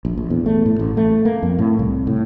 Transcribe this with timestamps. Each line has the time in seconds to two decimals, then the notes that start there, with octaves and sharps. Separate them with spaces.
0.05 A#1
0.18 A#1
0.30 E2
0.46 A3
0.66 A2
0.79 A1
0.97 A3
1.25 A#3
1.43 F2
1.59 A2
1.79 C2
2.07 A2